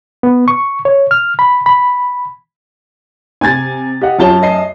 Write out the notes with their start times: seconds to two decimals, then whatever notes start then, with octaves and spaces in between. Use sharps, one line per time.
0.23 B3
0.48 C#6
0.85 C#5
1.11 F6
1.39 B5
1.66 B5
3.41 C3 G#5 G#6 A6
4.01 G4 D#5 F#5
4.19 F#2 F4 G4 C#5 A5 G7
4.43 D#5 C7